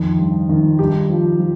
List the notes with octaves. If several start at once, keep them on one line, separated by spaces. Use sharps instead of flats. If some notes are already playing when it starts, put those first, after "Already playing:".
Already playing: F2 D#3
G2
D#3
G2 D#4 G4
F3
F3